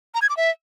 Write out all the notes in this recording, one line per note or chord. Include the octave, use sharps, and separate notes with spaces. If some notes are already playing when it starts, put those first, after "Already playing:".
A#5
G#6
D6
E5